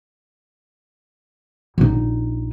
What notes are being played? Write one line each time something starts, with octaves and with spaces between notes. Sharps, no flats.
A#1 D#4